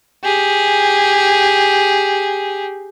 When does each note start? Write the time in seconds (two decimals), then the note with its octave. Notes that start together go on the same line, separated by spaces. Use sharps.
0.24 G4 G#4